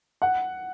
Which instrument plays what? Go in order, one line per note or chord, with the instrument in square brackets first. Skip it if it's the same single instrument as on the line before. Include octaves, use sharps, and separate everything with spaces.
[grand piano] F#5